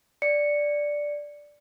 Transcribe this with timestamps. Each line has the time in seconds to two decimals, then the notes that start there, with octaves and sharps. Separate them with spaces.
0.22 D5 C#7